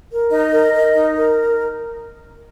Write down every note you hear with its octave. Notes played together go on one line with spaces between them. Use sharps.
A#4
D#4 D#5
A#4
A#4
D#4
A#4